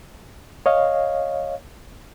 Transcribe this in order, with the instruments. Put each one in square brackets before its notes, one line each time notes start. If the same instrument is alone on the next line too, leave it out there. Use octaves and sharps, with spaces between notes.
[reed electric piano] C#5 D#5 F5